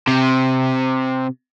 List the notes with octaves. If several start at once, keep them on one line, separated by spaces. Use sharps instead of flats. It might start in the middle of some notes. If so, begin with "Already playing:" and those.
C3